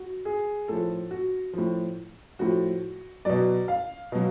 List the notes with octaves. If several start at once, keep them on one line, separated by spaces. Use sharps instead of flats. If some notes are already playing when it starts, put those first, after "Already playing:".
Already playing: F#4
G#4
A2 F3 A4
F#4
A2 F3
A2 F3 F#4
B2 F#3 D5
F5
B2 F#3